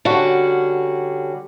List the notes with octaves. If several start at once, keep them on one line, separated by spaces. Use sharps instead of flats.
D3 G3 C#4 F#4